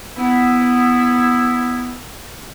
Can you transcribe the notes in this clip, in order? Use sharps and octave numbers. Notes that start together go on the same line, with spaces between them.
B3 E4